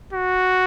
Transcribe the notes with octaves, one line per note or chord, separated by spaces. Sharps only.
F#4